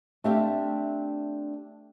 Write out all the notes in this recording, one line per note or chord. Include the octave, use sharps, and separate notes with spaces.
A3 C4 D4 G4 E5 F5